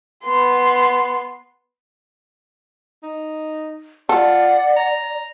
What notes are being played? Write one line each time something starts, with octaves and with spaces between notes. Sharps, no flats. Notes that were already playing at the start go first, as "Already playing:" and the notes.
B3 C6
D#4
F4 A4 D5 F#5
A#5